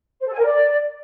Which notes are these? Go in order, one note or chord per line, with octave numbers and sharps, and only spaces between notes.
C5
A4
G#5
A#4
D5